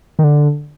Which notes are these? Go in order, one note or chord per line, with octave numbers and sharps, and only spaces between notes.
D#3
D3